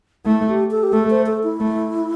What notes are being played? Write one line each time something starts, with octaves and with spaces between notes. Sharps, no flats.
A3 E4
G4
A4
G4
A3 A4
C5
A4
E4
A3